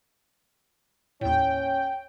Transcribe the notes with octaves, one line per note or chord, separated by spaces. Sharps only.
D#2 A2 C#4 G5